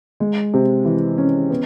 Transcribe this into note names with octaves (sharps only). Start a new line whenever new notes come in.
G#3
C3
E3
C#4
B3